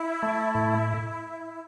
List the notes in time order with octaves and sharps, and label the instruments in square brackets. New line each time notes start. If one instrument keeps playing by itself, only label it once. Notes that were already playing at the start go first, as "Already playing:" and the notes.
Already playing: [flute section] E4
[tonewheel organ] A3
A2